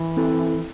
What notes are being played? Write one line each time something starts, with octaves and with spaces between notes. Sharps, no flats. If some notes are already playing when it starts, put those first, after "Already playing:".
Already playing: E3
C4 E4 A4